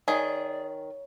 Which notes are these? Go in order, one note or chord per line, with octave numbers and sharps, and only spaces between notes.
D#3 G#4 C#5 D5